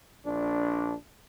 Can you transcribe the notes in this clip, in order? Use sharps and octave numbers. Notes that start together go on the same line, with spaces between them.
A#1 D4